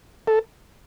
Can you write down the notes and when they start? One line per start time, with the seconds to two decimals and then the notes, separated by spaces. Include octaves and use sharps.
0.27 A4